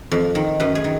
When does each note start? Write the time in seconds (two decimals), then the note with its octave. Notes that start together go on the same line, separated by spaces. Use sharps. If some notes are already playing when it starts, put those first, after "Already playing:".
0.11 F2
0.35 D#3
0.60 F#2 B4
0.75 G#4
0.84 D#3